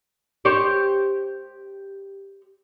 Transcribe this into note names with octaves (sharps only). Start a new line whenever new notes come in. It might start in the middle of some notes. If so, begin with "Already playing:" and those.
G4 C5 C#5